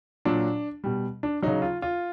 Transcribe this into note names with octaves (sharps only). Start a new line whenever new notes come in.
A#2 F#3 D4
B2 G3
D4
C#3 F#3 D#4
F4
F4